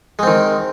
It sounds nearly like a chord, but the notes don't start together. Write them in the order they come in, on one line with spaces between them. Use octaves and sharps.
G#3 C4 D#3